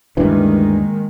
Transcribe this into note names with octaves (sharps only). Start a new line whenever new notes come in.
D2 G2 D#3 E3 G#3 A#3